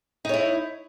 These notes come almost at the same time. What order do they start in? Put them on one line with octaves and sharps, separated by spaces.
D#4 C#5 E4